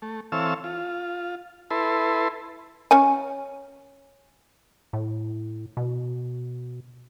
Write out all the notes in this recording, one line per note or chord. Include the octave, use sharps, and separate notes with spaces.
A3
E3 C4 A4 C#5 F5 E6
F4
E4 A4 B4 C6
C#4 C#5 G#5
A2
B2